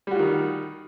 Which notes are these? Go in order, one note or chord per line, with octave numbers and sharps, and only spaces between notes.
D#3 G3 F4 F#4